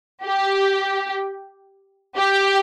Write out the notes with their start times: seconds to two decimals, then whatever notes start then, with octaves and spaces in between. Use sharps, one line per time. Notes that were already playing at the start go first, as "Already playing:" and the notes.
0.24 G4
2.16 G4